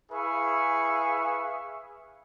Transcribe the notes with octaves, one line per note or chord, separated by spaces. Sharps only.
E4 G#4 B4 E5 F5 C#6